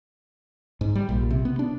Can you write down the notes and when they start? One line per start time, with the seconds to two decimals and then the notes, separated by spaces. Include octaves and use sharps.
0.81 G#2
0.95 G3
1.09 A#1
1.31 C3
1.45 B3
1.59 D4